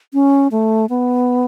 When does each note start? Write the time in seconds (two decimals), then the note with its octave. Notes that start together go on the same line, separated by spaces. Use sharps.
0.13 C#4
0.51 A3
0.89 B3